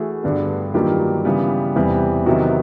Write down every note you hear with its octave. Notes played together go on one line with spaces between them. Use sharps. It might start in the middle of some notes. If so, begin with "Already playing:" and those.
Already playing: E3 A3 F#4 G#4
G2 D3 G3 B3
G2 D#3 F#3 A#3 F4 G4
C#3 E3 G3 B3
E2 C3 E3 G3 B3
C3 D#3 F#3 B3 E4 F#4